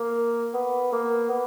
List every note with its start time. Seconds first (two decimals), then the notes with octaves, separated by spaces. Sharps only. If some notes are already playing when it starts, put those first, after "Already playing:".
Already playing: A#3
0.54 B3
0.93 A#3
1.30 B3